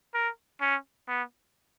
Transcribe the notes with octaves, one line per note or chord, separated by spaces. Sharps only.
A#4
C#4
B3